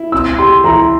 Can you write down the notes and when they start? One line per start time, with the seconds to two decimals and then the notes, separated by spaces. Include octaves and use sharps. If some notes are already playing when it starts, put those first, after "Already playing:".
Already playing: E4
0.12 C4 E6
0.38 G4 C6
0.64 E3 A#5